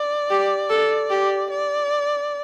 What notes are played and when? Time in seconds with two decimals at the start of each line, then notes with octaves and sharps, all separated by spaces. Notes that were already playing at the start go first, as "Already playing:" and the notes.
Already playing: D5
0.30 G4
0.70 A4
1.10 G4
1.50 D5